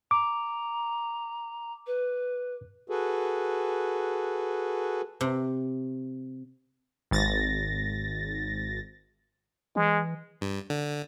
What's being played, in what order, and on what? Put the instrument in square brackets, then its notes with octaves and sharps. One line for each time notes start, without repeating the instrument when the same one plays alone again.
[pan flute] A#5 [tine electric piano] D6
[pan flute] B4
[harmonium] F#4 G#4 A4 B4
[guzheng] C3
[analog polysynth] G#1 A6 A#6
[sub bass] E3 [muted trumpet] G#3
[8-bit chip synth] G2
D3